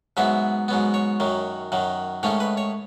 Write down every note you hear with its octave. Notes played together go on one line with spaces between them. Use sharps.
G#2 F#3 B3 E5
G#2 F#3 B3
C#5
F#2 D#3 F#3
F#2 D#3 F#3
G#2 D#3 A3 C#4 C#5
B4
C#5